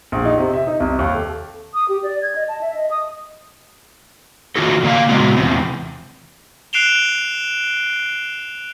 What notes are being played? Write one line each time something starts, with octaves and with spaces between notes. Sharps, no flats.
A#1
D#4
C3
E5
D#4
C2
D#2
A4
D#6
G4
D5
G#6
D#5
A5
E5
D#5
D#6
D#3 F4 F#4 A4
C#3 A#3 C#5 D5 F5
A#2 C#3 G#3 B3 F#4
E2 C3
F#6 C7 D7 E7 F7 G7